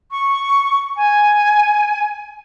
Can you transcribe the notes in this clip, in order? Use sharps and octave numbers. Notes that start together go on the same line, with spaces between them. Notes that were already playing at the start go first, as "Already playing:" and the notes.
C#6
G#5